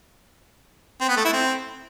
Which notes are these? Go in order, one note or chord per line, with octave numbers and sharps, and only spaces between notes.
C4
B3
A3
E4
C4